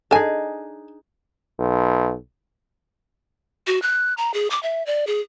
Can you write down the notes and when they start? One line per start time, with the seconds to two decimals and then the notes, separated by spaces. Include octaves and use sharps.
0.11 D4 D#4 G#4 A4 G#5
1.59 B1
3.67 F#4
3.82 F#6
4.17 A#5
4.34 G#4
4.51 D6
4.63 E5
4.86 D5
5.07 G#4